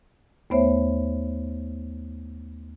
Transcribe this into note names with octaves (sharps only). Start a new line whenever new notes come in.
D#2 A3 B3 C5 C#5 E5